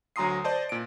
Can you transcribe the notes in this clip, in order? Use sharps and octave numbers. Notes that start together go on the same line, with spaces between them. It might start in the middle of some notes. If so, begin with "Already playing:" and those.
D2 F#3 A#5 C6 D#6 C7
C5 D5 D#5 A5
A#2 D7